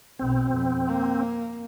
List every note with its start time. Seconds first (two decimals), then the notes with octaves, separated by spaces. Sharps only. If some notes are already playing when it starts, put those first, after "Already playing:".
0.19 B1 B2 C4
0.50 F2
0.88 A#3